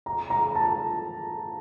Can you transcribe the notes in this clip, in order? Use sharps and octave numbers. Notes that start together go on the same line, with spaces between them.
A#5
A#5
A5